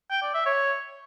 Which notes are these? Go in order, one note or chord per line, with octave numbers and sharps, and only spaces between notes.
G5
D5
E5
C#5